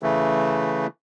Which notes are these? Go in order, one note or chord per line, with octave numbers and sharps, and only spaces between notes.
C#3 E3 A3